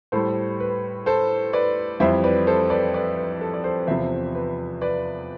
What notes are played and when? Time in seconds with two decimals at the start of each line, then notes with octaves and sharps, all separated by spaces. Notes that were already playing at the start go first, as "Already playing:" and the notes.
0.12 A2 G3 A4 C5
0.60 B4
1.06 A4 C5
1.53 B4 D5
2.00 F2 E3 G3 C5 E5
2.24 B4 D5
2.47 A4 C5
2.70 B4 D5
2.94 B4 D5
3.17 B4
3.41 A4
3.54 D5
3.64 A4 C5
3.87 E2 C3 F3 C5 E5
4.35 B4
4.81 B4 D5